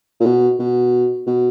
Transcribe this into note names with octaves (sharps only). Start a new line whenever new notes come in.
A#2
B2
B2
B2